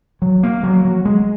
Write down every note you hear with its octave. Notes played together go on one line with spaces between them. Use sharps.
F#3
A#3
F#3
F#3
G#3